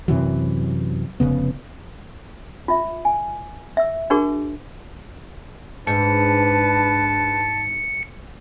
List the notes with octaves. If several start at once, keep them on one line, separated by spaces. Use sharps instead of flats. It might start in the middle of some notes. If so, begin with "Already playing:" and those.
F#2 C3 E3 F#3
F1 D#2 C#3 B3
F4 E5
G#5
E5 E6
D4 F#4 G#4 A#4 C#6
G#2 D4 B4 A5 C#7